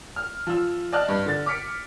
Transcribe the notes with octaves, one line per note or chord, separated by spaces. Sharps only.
F6
F3 E6
D5 D#5 A5 F6 F#6
G2
D3 A6
D6 F6 B6 C#7 D7